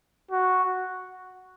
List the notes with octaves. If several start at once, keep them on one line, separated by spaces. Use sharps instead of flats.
F#4